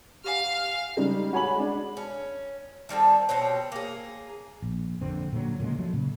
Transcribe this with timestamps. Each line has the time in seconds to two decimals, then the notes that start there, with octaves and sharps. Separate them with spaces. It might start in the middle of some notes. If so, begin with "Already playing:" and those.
0.24 G4 F5 F#5 G#5 F6
0.97 C#3 G3 G#3 D#4
1.33 F#4 C#5 G#5 B5 F#7
1.55 G#3 D4
1.97 C#4
2.89 D#3 G3 C4 A4
3.29 B2 C4 G4 C#5
3.72 A#3 G#4
4.62 A#1
5.01 A#1 F2 D3 C4
5.33 A#2 D3 F3 F#3
5.60 A#2 C#3 G3 G#3
5.78 F3 F#3 A3
5.93 A#2 C#3